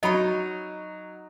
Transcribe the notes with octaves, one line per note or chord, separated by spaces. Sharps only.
F#3 D#4 C#5 D#5 B5